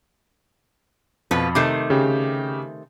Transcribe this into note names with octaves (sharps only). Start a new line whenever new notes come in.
F2 B2 F3 B4
C3 D#3 A3 D6 G6 C7
C#3 G4